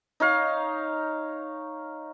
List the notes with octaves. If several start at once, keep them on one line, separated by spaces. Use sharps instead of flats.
D#4 C#5 F5